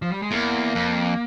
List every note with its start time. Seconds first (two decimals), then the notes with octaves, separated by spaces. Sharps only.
0.02 F3
0.12 G3
0.22 G#3
0.32 E2 A#3
0.75 F2